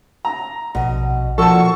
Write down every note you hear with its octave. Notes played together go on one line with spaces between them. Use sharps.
A#5
A#1 B2 D#5
A#2 F3 F4 F#4 A4 A5 C#6